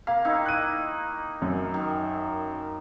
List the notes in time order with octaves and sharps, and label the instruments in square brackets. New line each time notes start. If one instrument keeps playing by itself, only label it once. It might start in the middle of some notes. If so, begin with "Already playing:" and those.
[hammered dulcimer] A#3 [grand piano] F5
[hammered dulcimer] D#3 D#4 E4
[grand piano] F#6 D#7
F#2
[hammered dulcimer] D#3